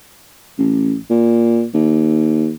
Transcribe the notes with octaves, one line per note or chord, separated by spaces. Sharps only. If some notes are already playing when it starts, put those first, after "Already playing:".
A1
A#2
D#2